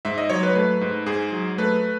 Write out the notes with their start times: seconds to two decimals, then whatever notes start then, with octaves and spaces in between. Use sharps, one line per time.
0.05 G#2 E5
0.18 D#5
0.30 F#3 C#5
0.43 B4
0.55 A3 B4
0.81 G#2
1.06 G#2 G#4
1.32 F#3
1.58 A3 B4